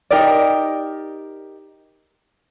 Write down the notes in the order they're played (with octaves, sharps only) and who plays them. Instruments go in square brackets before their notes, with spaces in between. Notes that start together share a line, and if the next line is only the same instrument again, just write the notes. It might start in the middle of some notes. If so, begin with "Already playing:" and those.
[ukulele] D#4 G4 A#4 D5